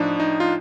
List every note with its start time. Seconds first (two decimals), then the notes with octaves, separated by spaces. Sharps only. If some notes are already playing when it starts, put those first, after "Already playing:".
Already playing: A2 F3 D4 D#4
0.20 D#4
0.40 F4